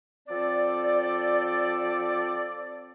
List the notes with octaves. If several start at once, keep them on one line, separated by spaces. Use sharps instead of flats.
F3 C4 A4 D5